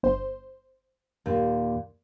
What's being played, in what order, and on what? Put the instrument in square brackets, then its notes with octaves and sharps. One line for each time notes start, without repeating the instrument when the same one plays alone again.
[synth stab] G1 C5
[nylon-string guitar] D#2 A#2